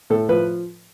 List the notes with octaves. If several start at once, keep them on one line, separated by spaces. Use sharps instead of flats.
A2 A4
F3 B4